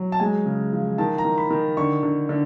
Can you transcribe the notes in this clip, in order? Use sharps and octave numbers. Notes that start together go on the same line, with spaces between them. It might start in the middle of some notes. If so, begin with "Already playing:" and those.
Already playing: F#3
A5
G#3 G#5
C#3
F3
D#3 A5
A#5
D#3
B5
D#3
D3 C#6
D3
D3